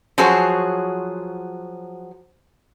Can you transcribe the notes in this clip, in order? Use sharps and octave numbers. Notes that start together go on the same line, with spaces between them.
F3 F#3 F#4 G#4 C5 C#5